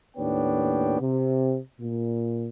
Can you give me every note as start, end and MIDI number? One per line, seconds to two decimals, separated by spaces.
0.17 0.98 39
0.17 0.98 45
0.17 0.98 59
0.17 0.98 62
0.17 0.98 73
0.17 0.98 79
1.00 1.58 48
1.79 2.48 46